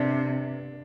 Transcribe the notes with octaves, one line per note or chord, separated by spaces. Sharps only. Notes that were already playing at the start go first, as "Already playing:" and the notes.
Already playing: C3 D4